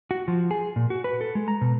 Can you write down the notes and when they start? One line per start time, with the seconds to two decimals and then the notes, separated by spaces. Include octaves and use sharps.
0.11 F#4
0.28 F3
0.51 G#4
0.76 A#2
0.90 F#4
1.04 B4
1.21 A4
1.35 G#3
1.48 A#5
1.61 B2